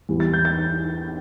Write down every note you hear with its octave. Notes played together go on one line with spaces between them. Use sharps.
E2 E3 G3
A6
G6
A6